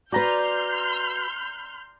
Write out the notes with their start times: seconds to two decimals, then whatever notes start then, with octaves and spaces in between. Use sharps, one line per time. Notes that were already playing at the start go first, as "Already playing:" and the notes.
0.12 F#4 B4 D5 A#5 C6 F6 G6